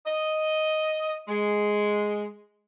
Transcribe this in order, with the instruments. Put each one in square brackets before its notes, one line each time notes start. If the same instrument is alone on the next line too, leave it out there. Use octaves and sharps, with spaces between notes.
[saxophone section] D#5
G#3